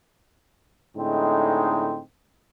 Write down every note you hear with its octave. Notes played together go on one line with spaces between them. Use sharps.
A2 D3 G#3 C4 D#4